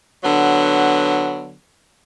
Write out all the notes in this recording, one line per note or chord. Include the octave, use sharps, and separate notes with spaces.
D3 F#3 B3